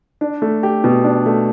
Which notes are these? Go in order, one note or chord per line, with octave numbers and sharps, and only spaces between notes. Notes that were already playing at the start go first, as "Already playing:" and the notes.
D4
A3
G4
B2
D4
A3